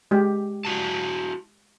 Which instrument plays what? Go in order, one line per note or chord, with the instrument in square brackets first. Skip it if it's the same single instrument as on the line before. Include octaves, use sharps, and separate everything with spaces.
[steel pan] G#3 G4
[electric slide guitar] E4 F#4 A5